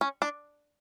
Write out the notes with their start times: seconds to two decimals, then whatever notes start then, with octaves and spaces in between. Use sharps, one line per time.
0.01 C#4
0.22 D4